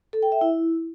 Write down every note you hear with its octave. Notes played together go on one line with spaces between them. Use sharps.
A4
G5
E5
E4